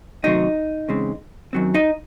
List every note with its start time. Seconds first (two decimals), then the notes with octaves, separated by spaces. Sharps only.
0.23 C3 D#3 F#3 A3 C4 D#4 D#5
0.88 E2 C#3 G#3 C4
1.53 F#2 D#3 F#3 C4
1.74 D#4 D#5